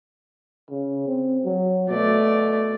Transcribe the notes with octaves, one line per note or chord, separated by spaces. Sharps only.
C#3
C4
F#3
B2 A3 D5